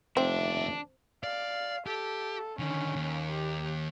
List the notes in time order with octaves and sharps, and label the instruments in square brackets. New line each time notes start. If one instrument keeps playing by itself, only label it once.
[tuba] F1 [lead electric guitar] D#2 E5 [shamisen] C4 [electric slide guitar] D4
[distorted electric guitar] D5 [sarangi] F5
[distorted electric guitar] G4 [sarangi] A4
[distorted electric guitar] D3 D#3 [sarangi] C#4
[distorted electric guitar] D#2
[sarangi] G4